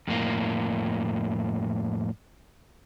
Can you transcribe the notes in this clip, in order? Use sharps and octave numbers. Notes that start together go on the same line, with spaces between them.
F2 A2 A#3